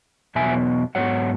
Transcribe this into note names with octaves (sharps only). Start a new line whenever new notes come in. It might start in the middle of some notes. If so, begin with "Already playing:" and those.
E2 B2 F#3 B3 E5 G#5
G#2 F#3 B3 C#5 F#5